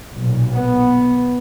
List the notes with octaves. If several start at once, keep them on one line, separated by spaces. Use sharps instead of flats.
B1 A#2
B3